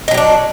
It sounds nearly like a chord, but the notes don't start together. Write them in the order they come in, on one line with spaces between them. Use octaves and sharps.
D#4 F#3 G4 D4